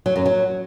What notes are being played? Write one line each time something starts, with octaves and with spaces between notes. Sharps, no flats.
F#3
F#2
F#3